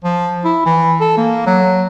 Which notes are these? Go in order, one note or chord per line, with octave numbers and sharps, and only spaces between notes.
F3
E4
E3
A4
A#3
F#3